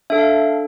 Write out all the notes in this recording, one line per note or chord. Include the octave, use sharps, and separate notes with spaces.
D4 A4 E5
F5